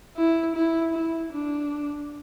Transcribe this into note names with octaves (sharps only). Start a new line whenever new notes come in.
E4
E4
E4
D4